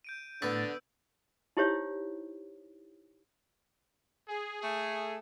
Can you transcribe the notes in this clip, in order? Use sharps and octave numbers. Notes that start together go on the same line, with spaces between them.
G6 D7 D#7
A2 D3 B3 B5 C#6 E6 A6
D#4 E4 G4 C5 C#5 E5
G#4
A3 G#4